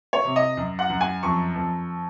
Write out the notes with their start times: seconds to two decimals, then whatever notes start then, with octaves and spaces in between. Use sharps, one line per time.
0.13 C#5
0.25 C3
0.36 D#5
0.57 F#2
0.79 F#5
0.89 F#2
1.01 G#5
1.23 F2 C#6
1.56 F2